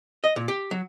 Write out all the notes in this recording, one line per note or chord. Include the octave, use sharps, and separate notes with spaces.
D#5
A#2
G4
F#3